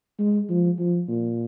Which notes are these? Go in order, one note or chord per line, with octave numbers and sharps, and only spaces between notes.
G#3
F3
F3
A#2